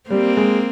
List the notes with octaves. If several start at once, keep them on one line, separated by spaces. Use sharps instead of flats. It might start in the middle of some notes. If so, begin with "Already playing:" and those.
G3 A#3 C4
G#3